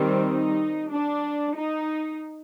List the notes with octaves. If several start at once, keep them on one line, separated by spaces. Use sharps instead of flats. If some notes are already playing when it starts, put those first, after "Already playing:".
Already playing: D#3 G3 C4
D#4
D4
D#4